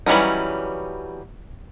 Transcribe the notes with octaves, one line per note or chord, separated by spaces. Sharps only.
E3 F#3 G3 C#4 D#4